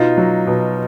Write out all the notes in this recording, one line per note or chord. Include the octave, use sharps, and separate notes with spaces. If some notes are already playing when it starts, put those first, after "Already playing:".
Already playing: B2 D#4 F4
F#3
B2